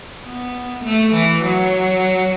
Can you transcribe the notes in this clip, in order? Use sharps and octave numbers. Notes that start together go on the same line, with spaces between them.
B3
A3
E3
F#3